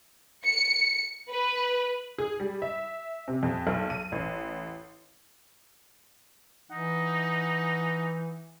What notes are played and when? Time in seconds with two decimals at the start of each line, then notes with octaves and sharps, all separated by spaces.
0.45 C#7
1.30 B4
2.18 G#4
2.40 G3
2.62 E5
3.28 C3
3.43 F2
3.67 B1
3.90 D#7
4.12 A1
6.71 E3 D#4 F#5